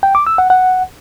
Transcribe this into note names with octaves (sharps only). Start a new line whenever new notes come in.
G5
D6
E6
F#5
F#5